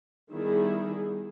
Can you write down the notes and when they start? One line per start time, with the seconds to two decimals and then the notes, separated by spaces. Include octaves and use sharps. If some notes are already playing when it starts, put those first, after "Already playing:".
0.31 D#3 G3 B3 E4 G#4